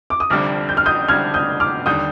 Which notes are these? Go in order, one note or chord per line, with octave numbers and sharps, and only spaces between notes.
D6
D#6
F1 F2 D3 G3 D6 F6
G6
F6
D#6 G6
F1 F2 D3 G3 F6 G#6
D#6 G6
D6 F6
D#2 D3 G3 D#6 G6